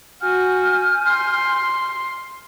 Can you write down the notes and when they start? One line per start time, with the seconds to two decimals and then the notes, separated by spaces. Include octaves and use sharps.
0.22 F#4 G#5 F6 G6
1.07 C6